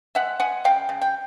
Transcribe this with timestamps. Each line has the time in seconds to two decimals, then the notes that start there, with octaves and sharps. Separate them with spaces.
0.15 G#3 E5 F#5
0.40 G#3 F#5 G#5
0.64 C#3 F5 G5
0.89 C#3
1.01 G5